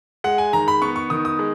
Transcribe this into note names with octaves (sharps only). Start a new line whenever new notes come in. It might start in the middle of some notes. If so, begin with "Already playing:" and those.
G#3 F#5
G#5
D#3 A#5
B5
B3 C#6
C#6
D#3 D#6
D#6
G#3